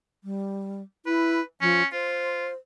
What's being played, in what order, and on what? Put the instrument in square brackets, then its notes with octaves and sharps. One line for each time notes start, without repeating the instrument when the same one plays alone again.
[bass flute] G3
[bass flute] E4 [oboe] B4
[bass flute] F3 [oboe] C#4
[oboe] F4 [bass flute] C5